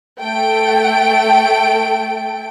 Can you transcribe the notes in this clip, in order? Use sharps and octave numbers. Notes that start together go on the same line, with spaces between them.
A3 A4 G5 D7